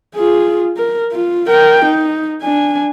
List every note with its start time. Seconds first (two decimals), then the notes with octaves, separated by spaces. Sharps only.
0.15 F4 G#4
0.77 A#4
1.12 F4
1.48 A#4 G5
1.85 D#4
2.42 D4 G#5